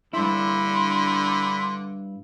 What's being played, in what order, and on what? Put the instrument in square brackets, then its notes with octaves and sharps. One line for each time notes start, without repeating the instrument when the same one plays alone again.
[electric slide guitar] G2 E4 [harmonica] D3 [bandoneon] B5 [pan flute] C6